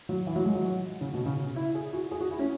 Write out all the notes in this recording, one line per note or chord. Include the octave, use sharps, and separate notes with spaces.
F#3
E3
F#3
G#3
F#3
C#3
B2
C#3
E4
G#4
F#4
G#4
F#4
E4
C#4